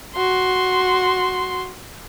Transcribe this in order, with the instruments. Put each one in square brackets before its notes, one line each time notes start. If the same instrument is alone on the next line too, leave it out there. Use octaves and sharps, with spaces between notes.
[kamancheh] F#4 C6